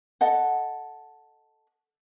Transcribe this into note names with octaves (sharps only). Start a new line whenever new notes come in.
A4 D#5 F#5